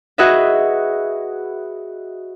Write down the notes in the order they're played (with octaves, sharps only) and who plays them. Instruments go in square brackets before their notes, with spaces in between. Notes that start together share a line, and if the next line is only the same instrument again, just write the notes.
[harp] F#4 G#4 B4 D#5 E5